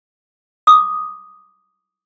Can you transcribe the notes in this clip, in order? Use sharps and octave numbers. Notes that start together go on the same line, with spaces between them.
D6 D#6